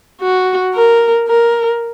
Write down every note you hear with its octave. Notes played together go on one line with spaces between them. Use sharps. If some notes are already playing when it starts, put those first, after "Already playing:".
F#4
A#4
A#4